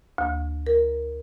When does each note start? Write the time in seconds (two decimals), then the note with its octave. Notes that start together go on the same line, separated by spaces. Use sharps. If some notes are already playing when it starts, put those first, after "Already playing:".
0.18 D2
0.67 A#4